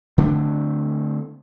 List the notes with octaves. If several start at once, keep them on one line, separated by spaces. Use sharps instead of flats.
D3 A3 C4 D4